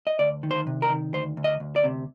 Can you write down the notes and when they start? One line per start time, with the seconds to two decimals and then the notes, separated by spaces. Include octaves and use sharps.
0.07 D#5
0.19 D2 D5
0.43 D#3
0.51 C5
0.67 C3
0.82 A#4
0.90 D#3
1.13 D2 C5
1.37 D2
1.44 D#5
1.60 D2
1.76 D5
1.84 C3